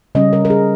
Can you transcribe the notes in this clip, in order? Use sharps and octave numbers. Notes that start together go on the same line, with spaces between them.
C#3 G3 C#4 D#5
A#4
A#4
G#4